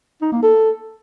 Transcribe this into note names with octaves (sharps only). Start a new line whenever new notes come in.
D#4
A#3
A4